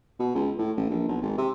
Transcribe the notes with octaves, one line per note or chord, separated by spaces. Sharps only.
B2
C#2
A2
A1
A#1
B1
G#1
C3